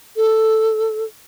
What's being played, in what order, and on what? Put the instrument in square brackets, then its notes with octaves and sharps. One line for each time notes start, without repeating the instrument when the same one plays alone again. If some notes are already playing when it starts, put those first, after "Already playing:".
[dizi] A4